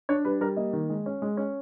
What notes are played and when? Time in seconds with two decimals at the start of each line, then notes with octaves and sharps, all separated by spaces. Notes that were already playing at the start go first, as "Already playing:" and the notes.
0.09 D4 C#5
0.25 G3 B4
0.41 G3 A#4
0.56 A#3 D#5
0.73 D#3
0.90 G#3
1.06 C#4
1.22 G#3
1.37 C#4